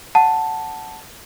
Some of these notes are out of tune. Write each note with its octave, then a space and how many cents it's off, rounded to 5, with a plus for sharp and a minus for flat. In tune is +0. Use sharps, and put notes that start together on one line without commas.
F#5 +0 A5 +0